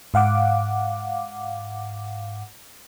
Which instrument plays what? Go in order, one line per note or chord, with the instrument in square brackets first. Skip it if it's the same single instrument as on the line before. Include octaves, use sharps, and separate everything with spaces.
[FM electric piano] G#2 F5 F#5 D6